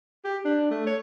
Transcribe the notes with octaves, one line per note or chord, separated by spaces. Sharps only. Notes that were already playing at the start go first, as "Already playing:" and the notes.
G4
D4
A3
C#5